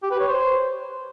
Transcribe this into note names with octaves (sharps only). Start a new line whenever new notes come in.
G4
B4
C#5
C5